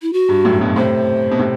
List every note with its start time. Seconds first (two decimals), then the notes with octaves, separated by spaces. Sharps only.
0.02 E4
0.13 F#4
0.29 G2
0.45 F#2 A2
0.61 G2 B2
0.76 A2 C3 C5
1.31 B2
1.39 A2 C3